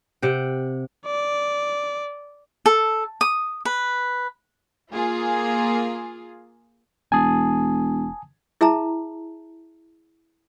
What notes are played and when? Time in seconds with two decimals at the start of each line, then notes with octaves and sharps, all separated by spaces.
0.22 C3 F#5 G5
1.07 D5
2.66 A4
3.21 D#6
3.65 B4
4.89 A#3 F4 G#4
7.12 E1 G#5 A5 D#6
8.61 E4 G#4 E5 A5 A#5